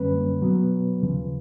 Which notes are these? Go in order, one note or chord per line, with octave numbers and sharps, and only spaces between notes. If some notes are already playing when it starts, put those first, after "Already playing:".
Already playing: F#2 D3 G3 A#3 C#4 B4
B2 F#3 B3
D#2 C#3 F3